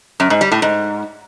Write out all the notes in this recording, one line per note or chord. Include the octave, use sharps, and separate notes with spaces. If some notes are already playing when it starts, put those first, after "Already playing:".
F#2
G#2
G3
A2
G#2